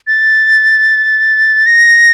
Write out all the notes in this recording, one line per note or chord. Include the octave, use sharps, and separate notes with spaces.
A6
A#6